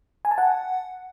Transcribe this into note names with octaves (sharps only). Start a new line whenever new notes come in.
G#5
A5
F#5